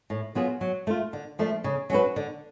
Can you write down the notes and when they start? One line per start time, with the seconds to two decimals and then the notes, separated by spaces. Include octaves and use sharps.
0.10 A2
0.35 F#3 B3 F4 G#4
0.61 F#3
0.87 A3 F4
1.13 D3
1.39 F3 A3 D4
1.64 C#3
1.90 F#3 C#4 F#4 B4
2.16 D3